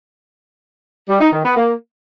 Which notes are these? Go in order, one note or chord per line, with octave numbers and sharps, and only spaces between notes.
G3
D#4
D#3
B3
A#3